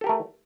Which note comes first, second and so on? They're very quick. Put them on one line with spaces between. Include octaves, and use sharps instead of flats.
A4 G4 A#4 A3